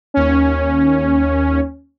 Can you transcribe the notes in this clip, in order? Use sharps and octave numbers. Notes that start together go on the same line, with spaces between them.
D#2 C#4